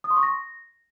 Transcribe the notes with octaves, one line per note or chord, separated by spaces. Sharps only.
D#6
C6
C#6
A#6